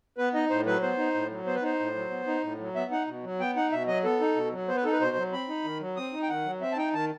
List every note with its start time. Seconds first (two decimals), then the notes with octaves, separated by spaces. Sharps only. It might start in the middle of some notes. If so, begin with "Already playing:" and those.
0.18 B3 B4
0.34 D#4 D#5
0.50 A2 C5
0.66 F#3 B4
0.82 B3 C5
0.98 D#4
1.14 A2
1.30 F#3
1.46 B3 C5
1.55 B4
1.62 D#4 C5
1.79 A2
1.95 F#3
2.10 B3
2.27 D#4
2.43 A2
2.59 F#3
2.75 B3 E5
2.91 D#4 F#5
3.07 B2
3.23 F#3
3.40 B3 G5
3.56 D#4 F#5
3.72 B2 E5
3.87 F#3 D#5
4.03 B3 A4
4.21 D#4
4.35 B2
4.52 F#3
4.68 B3 C5
4.76 B4
4.84 D#4 A4
4.92 B4
5.00 B2 C5
5.16 F#3
5.32 C4 B5
5.49 D#4
5.64 D#3
5.81 F#3
5.96 C4 D#6
6.13 D#4
6.23 G5
6.29 D#3 F#5
6.46 F#3
6.61 C4 E5
6.72 A5
6.77 D#4 G5
6.93 D#3 A5